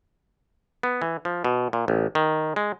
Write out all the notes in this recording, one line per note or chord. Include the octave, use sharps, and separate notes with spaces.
B3
E3
F3
B2
A#2
A1
D#3
G#3